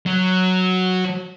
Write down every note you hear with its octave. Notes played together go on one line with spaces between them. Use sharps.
F#3